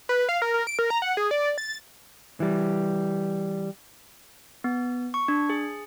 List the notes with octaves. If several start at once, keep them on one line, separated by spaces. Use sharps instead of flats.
B4
F5
A#4
A#4
D7
A#4
A#5
F#5
G#4
D5
A6
E3 G3
B3
C#6
D4
G#4